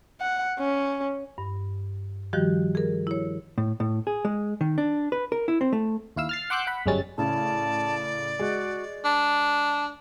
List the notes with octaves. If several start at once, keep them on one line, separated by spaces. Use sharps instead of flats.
F#5
C#4
G2
D#3 F3 G3 F#4 G4
G#4 A#4
E4 C#5
A2
A2
G#4
G#3
D#3
D4
B4
A#4
E4
C4
A3
D#2 E4 F5 E6
F6 A6 C7
F#5 C6 D6 E6 F#6 G6
F#5 B5
G1 F#2 G3 G#3 C#4 A6
A2 C#3 D5 A5
G#3 F#4
D4 A5